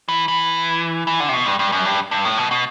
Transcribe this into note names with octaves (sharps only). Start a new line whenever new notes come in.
E3
E3
E3
D3
C3
B2
G2
G2
F#2
G2
G2
A2
B2
B2